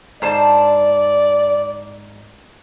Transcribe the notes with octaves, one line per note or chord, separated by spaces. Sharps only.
G#2 C5 D5 A5